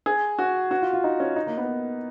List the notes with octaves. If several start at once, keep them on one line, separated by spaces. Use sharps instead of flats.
G#4
F#4
F#4
F4
F4
D#4
C#4
D#4
A#3
B3